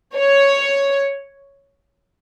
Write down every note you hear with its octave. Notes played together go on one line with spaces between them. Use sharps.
C#5